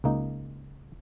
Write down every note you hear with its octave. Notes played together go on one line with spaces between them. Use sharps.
C#2 A#3 D#4